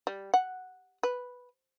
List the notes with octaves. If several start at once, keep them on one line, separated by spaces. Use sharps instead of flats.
G3
F#5
B4